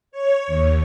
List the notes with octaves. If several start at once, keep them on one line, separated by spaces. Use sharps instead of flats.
C#5
D#2